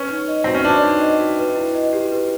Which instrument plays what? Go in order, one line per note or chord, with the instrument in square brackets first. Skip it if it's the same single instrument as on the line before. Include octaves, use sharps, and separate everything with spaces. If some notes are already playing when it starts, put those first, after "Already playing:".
Already playing: [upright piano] C#4 [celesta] B4
[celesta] D#4
D#5
[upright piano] C4 [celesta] F#4
[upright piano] C#4
[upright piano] D4 [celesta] B4
[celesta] D#4
D#5
F#4
B4
E4
D#5
G4
B4